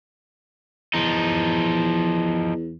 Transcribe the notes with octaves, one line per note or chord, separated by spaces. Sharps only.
E2 F3 D#4